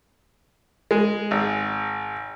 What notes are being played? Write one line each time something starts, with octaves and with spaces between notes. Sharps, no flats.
G#3
G#1